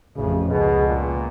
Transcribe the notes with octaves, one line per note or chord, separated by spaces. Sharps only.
A1 F2 C#3
C#2 B2 G#4
A#2